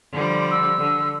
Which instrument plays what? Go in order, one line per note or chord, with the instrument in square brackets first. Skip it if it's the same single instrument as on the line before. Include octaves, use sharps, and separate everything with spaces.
[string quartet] D3 F3 G3
[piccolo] E6
[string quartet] D3